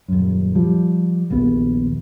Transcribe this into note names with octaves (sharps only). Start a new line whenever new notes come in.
D#1 F#2
F3 G3
A#1 D#2 B3